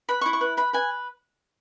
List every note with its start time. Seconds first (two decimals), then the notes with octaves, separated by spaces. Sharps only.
0.09 B4 B5
0.21 C#6
0.26 E4
0.33 C#6
0.41 B4
0.57 B4 B5
0.73 B4 G#5